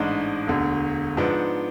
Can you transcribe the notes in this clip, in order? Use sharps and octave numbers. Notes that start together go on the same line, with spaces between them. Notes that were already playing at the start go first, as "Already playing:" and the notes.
Already playing: A1 G#2 G#3 D4
E1 D2 D3
G#2 F3 B3 D4